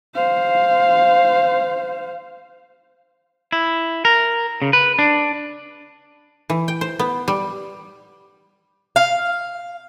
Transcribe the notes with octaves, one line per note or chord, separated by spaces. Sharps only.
C5 F5
E4
A#4
C#3
B4
D4
E3
G5
C5
B3
G3
F5